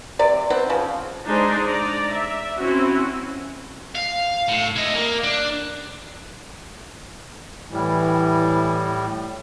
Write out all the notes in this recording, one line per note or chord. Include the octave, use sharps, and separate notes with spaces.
C3 D5
B3 C4
C#3 F3
G#3 D4 D#4 G#4 C5 D5
D5 A#5
E5
C4 C#4 E4 F#4
F5
A2
E4 D#5
A#3
D4
A2 E3 G3